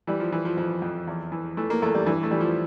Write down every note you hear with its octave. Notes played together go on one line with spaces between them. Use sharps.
E3 G3
F3
E3
F3
F2 F3
F2
E2
E3
E3 A3
A#3
E2 A3
G3
G2 E3
A3
E3 G3
F3